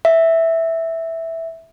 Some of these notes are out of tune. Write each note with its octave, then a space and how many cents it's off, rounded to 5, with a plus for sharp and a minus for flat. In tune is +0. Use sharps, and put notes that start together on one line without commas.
E5 -5